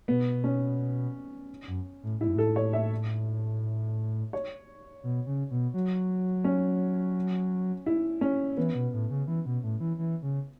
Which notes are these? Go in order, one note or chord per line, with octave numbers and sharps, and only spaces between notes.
B2 B3
C#4
F#2
A2
A2 E4
F#2
A2 A4
C#5
E5
C#5
B2
C#3
B2
F#3
C#4
E4
C#4
E3 B3
B2
A2
C#3
E3
B2
A2
E3
E3
C#3